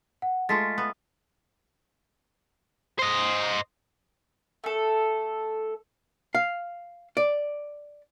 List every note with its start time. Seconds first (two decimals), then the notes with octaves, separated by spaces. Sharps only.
0.22 F#5
0.49 G#3 A3 F4 A6 B6
0.78 B3
2.99 C5 D#5
4.64 A3 A4
6.35 F5
7.17 D5